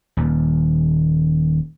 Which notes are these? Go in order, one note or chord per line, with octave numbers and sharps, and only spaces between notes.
D#1 D#2